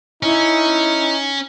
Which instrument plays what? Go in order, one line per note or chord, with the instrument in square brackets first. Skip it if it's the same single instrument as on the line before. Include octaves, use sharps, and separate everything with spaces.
[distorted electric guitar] C#4 [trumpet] D#4 [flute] E4